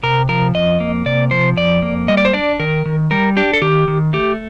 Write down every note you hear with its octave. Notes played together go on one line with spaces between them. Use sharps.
C3 A#4
F3 A#4
F2 D#5
A#3
C3 D5
F3 C5
F2 D5
A#3
G3 D#5
D5
C5
D4 D5
D#3 A#4
D#3
G3 A#4
D4 G4
A4
D#3 G4
D#3
A3 G4